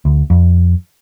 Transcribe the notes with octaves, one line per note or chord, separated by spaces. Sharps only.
D2
F2